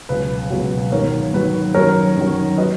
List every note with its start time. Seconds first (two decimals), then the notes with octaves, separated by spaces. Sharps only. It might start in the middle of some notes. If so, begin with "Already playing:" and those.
0.09 C#2 B2 F#3 B4
0.50 C#2 B2 F#3
0.92 G#2 D#3 F#3 A#4 C#5
1.34 G#2 D#3 F#3 B4
1.74 F#2 D#3 F#3 A#4 C#5
2.17 F#2 D#3 F#3
2.58 F#3 B4 D#5